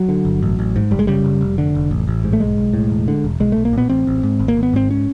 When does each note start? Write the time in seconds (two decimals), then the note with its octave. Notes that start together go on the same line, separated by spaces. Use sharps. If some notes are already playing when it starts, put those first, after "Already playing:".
Already playing: F#3
0.09 D3
0.25 G1
0.43 A1
0.59 A1
0.76 G#2
0.91 F#1 G3
0.99 G#3
1.07 C#3 G3
1.25 F#1
1.41 F1
1.58 D3
1.75 F1
1.91 A1
2.08 A1
2.24 G#2
2.33 A3
2.40 B1 G#3
2.58 B1
2.73 A2
2.90 E1
3.08 D3
3.24 E1
3.40 B1 G#3
3.52 B1 A3
3.65 A#3
3.73 A#2 B3
3.90 A1 C4
4.07 A1
4.23 G#2
4.39 G#1
4.48 A#3
4.57 G#1
4.63 B3
4.73 G#2 C4
4.91 C#4